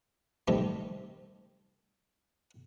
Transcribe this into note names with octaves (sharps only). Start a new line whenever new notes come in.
C3 D#3 G3 A3